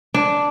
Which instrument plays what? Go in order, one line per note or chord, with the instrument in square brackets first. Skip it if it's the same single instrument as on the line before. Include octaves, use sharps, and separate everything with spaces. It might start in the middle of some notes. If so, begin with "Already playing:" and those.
[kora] D4